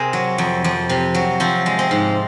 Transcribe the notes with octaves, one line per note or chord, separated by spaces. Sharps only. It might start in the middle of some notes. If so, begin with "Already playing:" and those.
Already playing: C3 G#4 A#4 C5
F#3
F2
F2
C3
F#3
F3 C4
G#3
C4
G#2